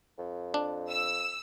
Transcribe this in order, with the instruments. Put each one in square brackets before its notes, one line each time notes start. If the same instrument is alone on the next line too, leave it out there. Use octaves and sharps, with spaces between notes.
[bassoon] F2
[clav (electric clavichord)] D4
[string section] E6